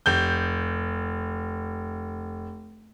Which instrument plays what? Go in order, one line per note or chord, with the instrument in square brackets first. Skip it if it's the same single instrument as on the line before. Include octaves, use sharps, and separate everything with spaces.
[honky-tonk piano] F1 G6